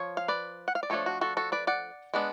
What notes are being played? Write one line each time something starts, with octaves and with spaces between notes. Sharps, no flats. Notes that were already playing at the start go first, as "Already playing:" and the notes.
Already playing: F3 C#5
F5
B4 D5
F#5
F5
D5
F3 A3 D4 A4 C#5
F#4
F#4 A4
F#4 A4
B4 D5
D5 F#5
G#3 B3 D4